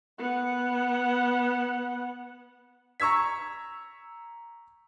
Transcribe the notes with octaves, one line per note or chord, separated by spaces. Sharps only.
B3 F#5
A#5 C#6 E6 G#6 B6